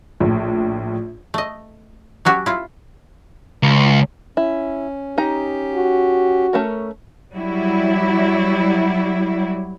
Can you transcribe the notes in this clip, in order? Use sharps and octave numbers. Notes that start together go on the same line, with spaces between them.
A#1 A2
A3 D#5
F#3 C#4 F#4 G4
E4 F4
C#2
C#4 E4
C#4 D#4 G4 A#5
F#4
A3 C#4 A#4
F#3 G3 E4